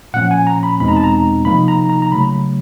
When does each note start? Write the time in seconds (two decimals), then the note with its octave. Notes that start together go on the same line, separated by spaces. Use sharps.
0.14 A#2 F3 A#3 C#4 F#5
0.31 G#5
0.47 A#5
0.63 B5
0.80 E2 B2 G#3 C4 D#4 B5
0.88 A#5
0.96 A5
1.04 A#5
1.45 C3 F3 A#3 D#4 B5
1.68 A#5
1.90 A#5
2.02 A#5
2.12 C#3 F#3 A3 B5